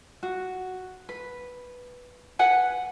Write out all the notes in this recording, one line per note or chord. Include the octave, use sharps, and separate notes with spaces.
F#4
B4
B4 F#5 G#5